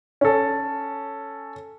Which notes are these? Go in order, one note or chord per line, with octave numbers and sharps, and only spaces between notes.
C#4 A4